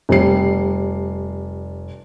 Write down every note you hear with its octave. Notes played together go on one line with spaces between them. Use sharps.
F1 G3 C7